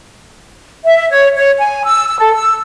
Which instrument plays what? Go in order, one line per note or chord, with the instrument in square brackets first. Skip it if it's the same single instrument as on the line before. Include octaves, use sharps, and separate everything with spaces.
[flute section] E5
C#5
C#5
G#5
E6
E6
A4
E6